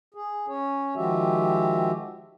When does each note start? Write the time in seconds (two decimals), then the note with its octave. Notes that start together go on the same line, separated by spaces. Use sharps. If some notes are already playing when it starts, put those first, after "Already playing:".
0.14 G#4
0.48 C#4 C#5
0.96 D#3 F3 G#3 F#4 G4 E5